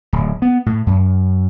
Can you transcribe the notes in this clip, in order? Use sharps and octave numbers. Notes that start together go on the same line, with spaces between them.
D1
B3
A2
F#2